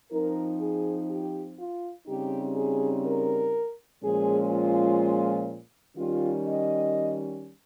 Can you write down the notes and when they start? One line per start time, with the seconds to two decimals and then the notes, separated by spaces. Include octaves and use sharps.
0.11 F3 C4 D#4 A#4
0.60 G#4
1.09 G4
1.57 F4
2.07 C#3 G3 C4 D#4 G4
2.55 G#4
3.04 A#4
4.02 A#2 F3 G#3 C#4 G#4
4.51 F4
5.97 D#3 G3 C#4 F4
6.45 D#5